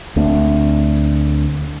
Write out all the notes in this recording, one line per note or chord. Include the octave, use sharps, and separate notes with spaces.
D2 A3 C4 D4